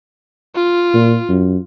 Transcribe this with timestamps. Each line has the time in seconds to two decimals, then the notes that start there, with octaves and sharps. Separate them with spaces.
0.55 F4
0.94 A#2
1.29 F#2